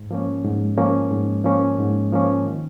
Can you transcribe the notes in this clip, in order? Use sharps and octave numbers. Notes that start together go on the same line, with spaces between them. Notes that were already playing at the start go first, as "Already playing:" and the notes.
Already playing: G#2
F3 A#3 C#4
G#2
F3 A#3 C#4
G#2
F3 A#3 C#4
G#2
F3 A#3 C#4
D#3